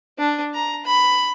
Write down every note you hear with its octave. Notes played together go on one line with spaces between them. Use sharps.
D4
A#5
B5